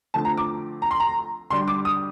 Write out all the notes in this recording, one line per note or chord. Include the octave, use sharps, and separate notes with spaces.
D3 F3 A3 C4 A5
A#5
D6
A#5
C6
A#5
D3 G3 D4 C6
D6
D#6